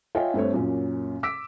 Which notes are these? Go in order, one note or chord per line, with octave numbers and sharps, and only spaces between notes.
F4 C#5 D#5 E5 G5 G#5
G2 A3 C4 C#5
F#2 A#2 C#4
D6 E6 B6 D7